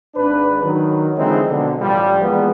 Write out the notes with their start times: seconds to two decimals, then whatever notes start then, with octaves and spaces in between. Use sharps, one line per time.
0.15 G#1 D4 B4
0.64 D#3 F#3
1.17 D3 E3 F3 G#3 C4 D#4
1.49 B2 D3
1.81 A1 F3 G3
2.20 E3 F3 G#3 A#3 B3